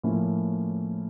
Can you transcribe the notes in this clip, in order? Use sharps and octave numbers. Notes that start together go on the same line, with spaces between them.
A2 F3 A#3 C#4 E4